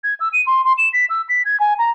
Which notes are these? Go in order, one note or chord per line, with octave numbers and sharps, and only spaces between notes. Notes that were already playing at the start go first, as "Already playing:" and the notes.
G#6
E6
D#7
C6
C6
E7
B6
E6
B6
G#6
G#5
A#5